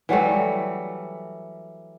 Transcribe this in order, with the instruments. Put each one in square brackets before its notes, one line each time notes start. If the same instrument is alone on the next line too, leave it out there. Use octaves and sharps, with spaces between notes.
[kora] E3 F#3 G3 A3